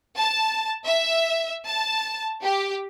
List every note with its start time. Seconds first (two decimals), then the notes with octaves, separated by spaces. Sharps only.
0.17 A5
0.84 E5
1.66 A5
2.43 G4